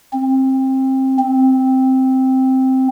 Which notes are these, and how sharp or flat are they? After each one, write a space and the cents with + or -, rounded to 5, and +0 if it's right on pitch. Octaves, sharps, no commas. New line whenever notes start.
C4 +20
C4 +0